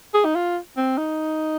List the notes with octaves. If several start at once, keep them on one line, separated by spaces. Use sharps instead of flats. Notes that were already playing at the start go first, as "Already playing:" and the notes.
G#4
D#4
F4
C4
D#4